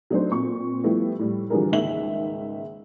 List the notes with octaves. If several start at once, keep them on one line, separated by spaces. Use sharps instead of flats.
F#3 A3 D4 D#4 F#4 C5
A#2 C4 C#6
F3 G3 A3 B3 E4 G4
A2 G3
D3 E3 F3 G3 G#4 A#4
C#2 G#2 D#3 A#3 E5 F#7